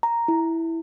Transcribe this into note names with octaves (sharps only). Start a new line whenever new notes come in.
A#5
E4